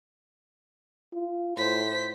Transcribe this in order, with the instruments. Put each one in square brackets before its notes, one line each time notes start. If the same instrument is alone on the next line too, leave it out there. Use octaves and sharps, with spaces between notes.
[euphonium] F4
[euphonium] A2 [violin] C5 B6